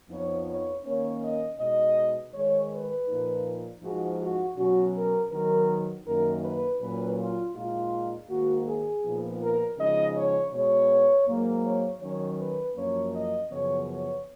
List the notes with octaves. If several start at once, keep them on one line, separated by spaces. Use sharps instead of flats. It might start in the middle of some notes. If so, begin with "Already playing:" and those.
F2 F3 B3 D#4 C#5
C#5
D#3 A#3 C#4 C#5
D#5
B2 G#3 D#4 D#5
G#2 D#3 G#3 C#5
B4
A#2 F3 A#3 D#4
G#2 F3 G#3 D#4 F#4
F#4
B2 F#3 C#4 F#4
A#4
D#3 F#3 B3 D#4 A#4
F#2 D#3 A#3 D#4 A#4
B4
A#2 F#3 C#4 B4
F4
A#2 G#3 D#4 F4
G#2 D#3 A#3 F#4
G#4
A#2 F3 B3 D#4
A#4
C#3 F3 G#3 D#4 D#5
C#5
B2 G#3 B3 C#5
G#2 F#3 A#3
C#5
D#3 F#3 C#4 C#5
B4
F#2 F3 A#3 C#4 C#5
D#5
F#2 C#3 F3 B3 C#5
C#5